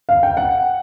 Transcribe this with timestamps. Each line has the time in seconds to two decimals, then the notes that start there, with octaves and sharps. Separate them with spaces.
0.09 F5
0.23 G5
0.37 F#5